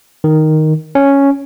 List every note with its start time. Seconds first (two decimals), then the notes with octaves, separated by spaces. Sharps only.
0.24 D#3
0.95 C#4